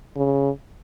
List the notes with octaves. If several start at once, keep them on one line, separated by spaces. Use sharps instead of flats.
C#3